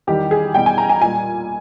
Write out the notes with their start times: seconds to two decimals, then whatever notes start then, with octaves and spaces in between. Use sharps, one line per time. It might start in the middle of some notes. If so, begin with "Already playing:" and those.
0.07 E2 D#3 G3 G4
0.31 G#4
0.54 E2 B2 G3 G5
0.66 G#5
0.78 A#5
0.90 G#5
1.01 A#2 G3 G#5